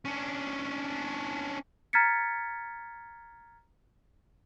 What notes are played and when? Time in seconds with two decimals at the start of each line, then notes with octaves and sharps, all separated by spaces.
0.05 C#4 D4
1.93 A#5 F6 G#6 A6 B6 C#7